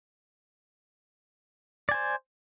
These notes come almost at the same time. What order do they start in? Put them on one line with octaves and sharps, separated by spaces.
D5 G#5 C5